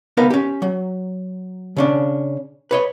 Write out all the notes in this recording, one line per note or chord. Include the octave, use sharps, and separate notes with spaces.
C#2 B3 D#4 A#4 B4 F5
C#4 G4
F#3
C#3 C#4 D4
B4 C#5 D#5